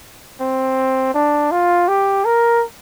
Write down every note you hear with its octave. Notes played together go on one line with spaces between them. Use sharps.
C4
D4
F4
G4
A#4